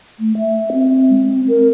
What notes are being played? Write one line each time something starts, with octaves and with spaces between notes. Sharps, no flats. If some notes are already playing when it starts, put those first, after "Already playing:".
A3
E5
C4
G#3
C4
A#4